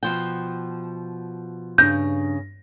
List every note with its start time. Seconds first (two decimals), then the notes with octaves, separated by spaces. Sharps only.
0.03 B2 F3 G5
1.78 G2 C#3 G6 A#6